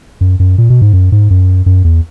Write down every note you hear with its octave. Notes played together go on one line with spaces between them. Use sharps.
F#2
F#2
A#2
B2
G#2
F#2
G#2
F#2
F#2
E2